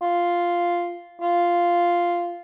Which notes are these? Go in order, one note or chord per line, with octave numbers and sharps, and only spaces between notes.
F4
F4